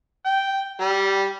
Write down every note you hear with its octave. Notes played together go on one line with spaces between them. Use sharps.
G5
G3